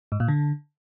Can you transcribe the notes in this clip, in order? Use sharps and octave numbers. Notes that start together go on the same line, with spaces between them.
G#2
A#2
D3